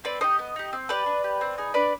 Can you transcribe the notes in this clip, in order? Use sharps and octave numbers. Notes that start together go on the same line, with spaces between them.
C4 B4 D5
D#4 G4 C5 D#5
B3
D#4 G4
C4
G4 B4 D5
D4
G4
C4
D#4 G#4
D4 B4 D5